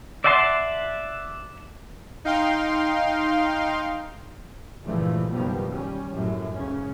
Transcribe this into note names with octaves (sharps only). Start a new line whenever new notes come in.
D5 E5 F#5 A5 C6
D#4 F5 G5 C6
C#2 G2 A#2 E3 F3 A3
F#1 B2 D#3 F3 G3 B3
G3 C#4
A#1 F#2 A2
C#2 G#2 C#3 C#4